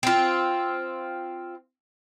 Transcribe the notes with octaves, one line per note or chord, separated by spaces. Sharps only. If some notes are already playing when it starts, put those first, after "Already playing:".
C4 F4